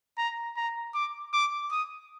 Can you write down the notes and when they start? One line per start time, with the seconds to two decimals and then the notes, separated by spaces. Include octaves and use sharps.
0.18 A#5
0.57 A#5
0.94 D6
1.33 D6
1.71 D#6